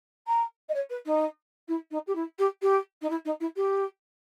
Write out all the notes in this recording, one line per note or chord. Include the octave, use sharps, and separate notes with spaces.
A#5
D#5
C#5
B4
D#4
E4
D#4
G4
E4
G4
G4
D#4
E4
D#4
E4
G4